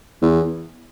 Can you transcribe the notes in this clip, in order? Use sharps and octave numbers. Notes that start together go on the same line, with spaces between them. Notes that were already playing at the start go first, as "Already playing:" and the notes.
E2